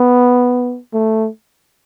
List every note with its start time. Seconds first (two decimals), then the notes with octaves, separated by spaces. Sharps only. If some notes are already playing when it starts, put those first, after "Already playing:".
Already playing: B3
0.93 A3